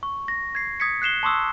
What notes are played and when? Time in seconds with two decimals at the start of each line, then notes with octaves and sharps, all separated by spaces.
0.03 C#6
0.28 A#6
0.55 G#6 C7
0.80 D#6 G#6 B6 C#7
1.02 F#6 C7 E7 G7
1.23 A5 C6 C#6 D#6 E6 F#6